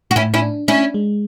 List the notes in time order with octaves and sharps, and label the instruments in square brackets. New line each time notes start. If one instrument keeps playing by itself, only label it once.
[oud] F#4
[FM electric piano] A2 [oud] C#4 E4
[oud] C#4 E4
[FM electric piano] D4
[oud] C#4 E4 [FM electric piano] D4
[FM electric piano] G#3